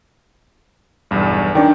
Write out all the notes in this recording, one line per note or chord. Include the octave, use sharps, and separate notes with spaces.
B1 E2 G2
D#3 D4 D5 G5